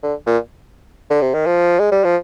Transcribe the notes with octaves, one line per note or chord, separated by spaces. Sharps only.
D3
A#2
D3
C3
D#3
F3
G#3
G3
F3